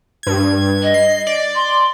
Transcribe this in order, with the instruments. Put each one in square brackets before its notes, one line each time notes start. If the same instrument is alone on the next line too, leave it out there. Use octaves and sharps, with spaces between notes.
[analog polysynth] G2 G#6
[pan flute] D#5
[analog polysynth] C7
D5
[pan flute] C6